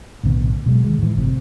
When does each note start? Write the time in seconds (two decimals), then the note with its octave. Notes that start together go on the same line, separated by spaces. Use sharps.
0.23 B1 A2 D3 B3
0.66 B2 F#3 G#3
0.84 D#3 G#3
0.99 A2 E3
1.16 G1 C3